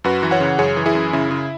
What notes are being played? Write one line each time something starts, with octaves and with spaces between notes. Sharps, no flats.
F#2 F#4 B4
E3
C#5 F#5
C#3
F#2 G#4 C#5
E3
E4 G#4
F#2
C#3 E4
C#3